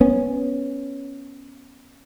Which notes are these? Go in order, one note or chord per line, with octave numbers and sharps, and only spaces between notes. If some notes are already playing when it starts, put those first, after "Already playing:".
B3 C#4